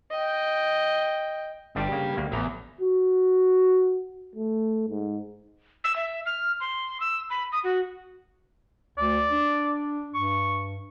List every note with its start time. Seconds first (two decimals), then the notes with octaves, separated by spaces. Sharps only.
0.12 D#5 G5
1.76 G1 G2 G3 D4 G4
1.91 C#3 A#3
2.17 D2 A#3
2.32 A1 E2 A#5
2.81 F#4
4.35 A3
4.89 G#2
5.84 E6
5.96 E5
6.26 F6
6.60 C6
7.00 E6
7.30 B5
7.52 D#6
7.64 F#4
8.98 D2 D5
9.31 D4
10.15 G2 C#6